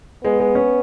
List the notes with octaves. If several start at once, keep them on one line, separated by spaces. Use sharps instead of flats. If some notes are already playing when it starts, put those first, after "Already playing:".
G#3 B3
G#3
C#4